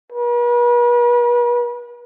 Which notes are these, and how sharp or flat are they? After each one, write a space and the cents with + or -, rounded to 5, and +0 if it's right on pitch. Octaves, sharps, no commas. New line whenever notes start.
B4 -40